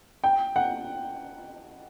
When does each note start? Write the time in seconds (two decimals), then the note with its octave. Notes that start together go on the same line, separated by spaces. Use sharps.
0.24 G5
0.56 F#5